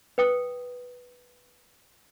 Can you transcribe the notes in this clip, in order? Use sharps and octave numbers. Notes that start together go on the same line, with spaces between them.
B4 G5 D#6